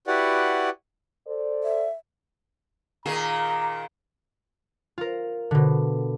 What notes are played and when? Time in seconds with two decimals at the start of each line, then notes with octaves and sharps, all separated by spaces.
0.07 E4 F#4 G4 B4 D5 F#5
1.27 A4 C5 D5
1.63 E5
3.06 A#2 D#3 G#4 A#5
4.98 F4 A#4
5.51 B2 D3